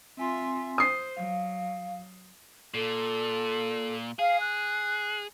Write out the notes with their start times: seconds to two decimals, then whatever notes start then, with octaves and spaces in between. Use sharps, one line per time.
0.17 C4 F4 E5 G#5 C6
0.78 C5 D#6 C7
1.17 F#3 F5
2.74 A#2 A4
4.19 G#4 F5
4.40 F#6